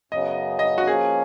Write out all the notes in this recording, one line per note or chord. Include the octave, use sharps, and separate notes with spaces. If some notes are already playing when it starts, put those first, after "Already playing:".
F#2 C#3 F#3 B3 D#5
D#5
F#4
F3 A#3 C#4 G#4